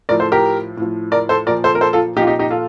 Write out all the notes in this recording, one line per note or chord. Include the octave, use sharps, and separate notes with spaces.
A2 F3 A#4 D5
A4 C5
G4 A#4
A2 F3
A#4 D5
A4 C5
A#2 F3 A#4 D5
A4 C5
A#4
A4 C5
F4 A4
A#2 F3 D#4 G4
F4
D#4 G4
D#4 G4
F4 A4